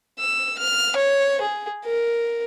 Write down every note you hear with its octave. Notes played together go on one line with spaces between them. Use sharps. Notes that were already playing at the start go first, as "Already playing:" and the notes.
E6
F6
C#5
G#4
A#4